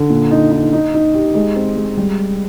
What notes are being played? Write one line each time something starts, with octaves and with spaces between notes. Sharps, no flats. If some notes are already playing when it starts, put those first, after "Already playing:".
Already playing: D3
A#2
D#4
D#4
D#4
D#4
G4
G#3
C4
G#3
G3